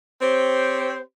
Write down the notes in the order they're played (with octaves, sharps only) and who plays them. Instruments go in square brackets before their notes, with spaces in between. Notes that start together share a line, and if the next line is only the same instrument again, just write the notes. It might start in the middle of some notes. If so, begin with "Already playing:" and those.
[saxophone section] C4 G4 C5 C#5